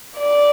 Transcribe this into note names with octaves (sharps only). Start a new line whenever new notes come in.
D5